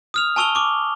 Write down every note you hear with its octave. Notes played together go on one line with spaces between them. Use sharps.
D#6 F6 F7
G#5 A5 C#6 E6 F7 G7
C#6 D6